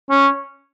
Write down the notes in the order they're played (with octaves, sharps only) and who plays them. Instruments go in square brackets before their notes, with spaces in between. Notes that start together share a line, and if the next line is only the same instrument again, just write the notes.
[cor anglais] C#4